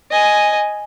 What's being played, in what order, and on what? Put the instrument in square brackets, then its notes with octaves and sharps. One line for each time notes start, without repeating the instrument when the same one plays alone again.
[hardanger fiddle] D#5 G#5